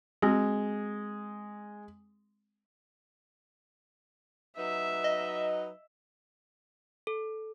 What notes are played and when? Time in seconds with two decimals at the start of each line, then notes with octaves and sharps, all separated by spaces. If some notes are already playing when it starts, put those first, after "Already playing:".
0.22 G#3 C4 F#4 G#4
4.57 F#3 D#4 B4 E5
5.04 D#5
7.07 A4